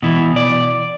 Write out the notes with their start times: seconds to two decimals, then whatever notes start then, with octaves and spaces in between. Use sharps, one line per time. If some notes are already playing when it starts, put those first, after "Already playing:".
0.03 B2 E3
0.36 D5